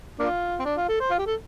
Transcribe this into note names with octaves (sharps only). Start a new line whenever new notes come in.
A#3 D4 F4
C4
D4
F4
A4
C5
F4
G4
A4